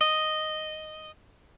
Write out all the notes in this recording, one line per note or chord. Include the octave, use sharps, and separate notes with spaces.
D#5